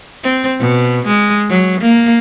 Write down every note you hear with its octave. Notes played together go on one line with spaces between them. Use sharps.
C4
B2
G#3
F#3
A#3